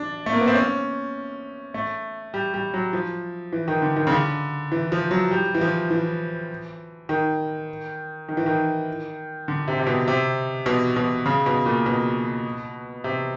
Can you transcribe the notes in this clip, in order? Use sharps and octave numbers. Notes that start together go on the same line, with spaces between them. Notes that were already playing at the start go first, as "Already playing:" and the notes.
Already playing: D4
A3
A#3
B3
C4
C#4
A3
G3
G3
F#3
F3
E3
D#3
D3
D#3
C#3
D3
E3
F3
F#3
G3
E3
F3
E3
D#3
D#3
E3
D#3
D3
C3
C3
B2
C3
B2
B2
C#3
B2
A#2
B2
C3